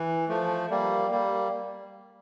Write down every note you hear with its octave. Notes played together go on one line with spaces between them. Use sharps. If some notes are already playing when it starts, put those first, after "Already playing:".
Already playing: E3
F3 A3
G3 A#3
G3 A#3